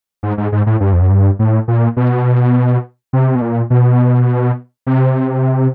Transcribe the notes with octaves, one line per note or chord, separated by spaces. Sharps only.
G#2
G#2
G#2
A2
G2
F2
F#2
G2
A2
A#2
B2
C3
B2
A#2
B2
C3